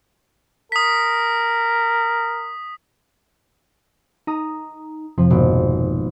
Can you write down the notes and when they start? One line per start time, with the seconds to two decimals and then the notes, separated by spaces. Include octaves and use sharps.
0.72 A#4 D#6 B6
4.27 D#4 A#5 D#6
5.18 F2 C3 F3
5.31 G#1 B2 A#3